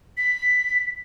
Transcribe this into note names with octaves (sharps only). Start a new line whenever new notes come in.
B6